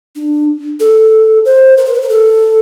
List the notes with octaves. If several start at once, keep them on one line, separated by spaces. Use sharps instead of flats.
D4
A4
C5
A#4
C5
B4
A#4
A4